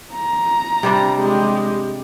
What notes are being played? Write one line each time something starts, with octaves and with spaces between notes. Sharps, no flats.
A#5
C3 G3 D4
G#3 G4